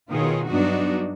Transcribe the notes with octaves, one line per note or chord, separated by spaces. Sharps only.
B2 D#3 F4 G#4 C#5
G2 F#3 B3 D4 D#4 F#4